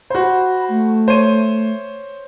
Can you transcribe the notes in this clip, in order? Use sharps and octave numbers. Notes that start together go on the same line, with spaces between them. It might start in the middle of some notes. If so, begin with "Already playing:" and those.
F#4 C5 B5
A3
C5 C#5 D#7